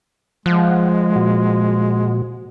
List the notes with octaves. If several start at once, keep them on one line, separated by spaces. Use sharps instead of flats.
F3 G#3 F#5
A#2 F#4